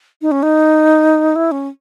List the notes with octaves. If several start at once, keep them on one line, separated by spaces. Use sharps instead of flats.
D#4
C#4
D#4
E4
C#4